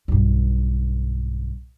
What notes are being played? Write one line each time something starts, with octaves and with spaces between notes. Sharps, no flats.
B1 G2